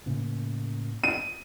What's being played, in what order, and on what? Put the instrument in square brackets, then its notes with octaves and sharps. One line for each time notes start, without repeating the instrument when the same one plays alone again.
[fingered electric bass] A2 C#3 A#3
[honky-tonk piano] D#7